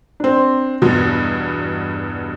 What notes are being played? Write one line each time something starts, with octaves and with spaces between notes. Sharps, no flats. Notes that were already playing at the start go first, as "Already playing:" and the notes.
C4 D4
E2 G2 B2